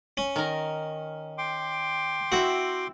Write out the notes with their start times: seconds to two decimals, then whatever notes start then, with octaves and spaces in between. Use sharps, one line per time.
0.17 C#4
0.36 D#3 A#4
1.38 G5 C6 D6
2.32 C4 E4 F#4 E5